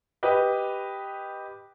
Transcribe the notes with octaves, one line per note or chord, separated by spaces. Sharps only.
G4 B4 D#5